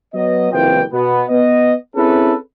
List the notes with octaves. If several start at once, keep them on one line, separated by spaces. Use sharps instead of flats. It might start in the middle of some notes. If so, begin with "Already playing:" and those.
F#3 B3 D#5
F#1 C2 E3 C4 F4 G5
B2 B3
B3 D#5
C4 C#4 E4 G#4 A4 B4